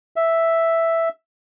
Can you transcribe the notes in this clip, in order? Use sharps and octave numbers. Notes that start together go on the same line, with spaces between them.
E5